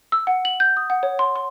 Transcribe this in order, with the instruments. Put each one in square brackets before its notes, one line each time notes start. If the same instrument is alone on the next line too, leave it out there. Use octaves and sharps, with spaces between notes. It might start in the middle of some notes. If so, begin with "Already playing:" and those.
[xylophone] E6
F#5
F#7
G6
D#6
F#5
C#5
C6
C6